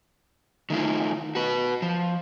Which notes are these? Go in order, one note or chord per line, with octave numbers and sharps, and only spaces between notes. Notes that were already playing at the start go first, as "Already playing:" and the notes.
D#3 A3 E4 F4
F#4 B4
F3